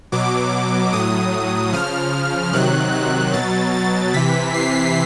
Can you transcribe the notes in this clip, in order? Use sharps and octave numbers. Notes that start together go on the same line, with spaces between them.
B2 F#3 D6
A2 F#3 D#6
C#3 F3 F6
C3 D#3 F#3 F#6
F#6
B2 F#3 A6
A6
C3 E3 B6
C7